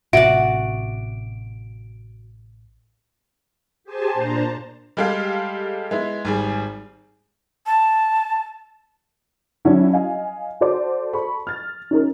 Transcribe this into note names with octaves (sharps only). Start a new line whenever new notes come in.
A1 C3 F#4 D5 E5 D7
G4 G#4 C5 G#5 A5
A#2 D4 C5 A5 A#5
G3 G#3 G4 A4 F5
G#3 B3 E4
G#1 G3 G#4
A5
F#3 C#4 D4 E4 F#4
D#5 F5 G#5
F#4 A4 C5 D5 D6
A4 B5 C#6
F6 A6
C#4 D#4 A#4